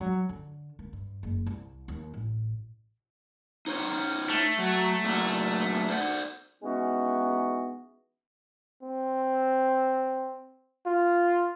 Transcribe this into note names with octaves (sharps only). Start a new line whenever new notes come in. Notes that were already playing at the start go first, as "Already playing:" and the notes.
F#3
D3
A#3
G2
F#1
C2
D#2
A1
D#4 C5 C#5
A3
F#3
A#2 F#3 A#3
C5 D5 F#5
E3 G#3 B3 C#4 D#4 F#4
C4
F4